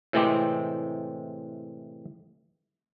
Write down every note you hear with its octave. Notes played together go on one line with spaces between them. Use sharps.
A2 C3 E3 G#3 C4 G4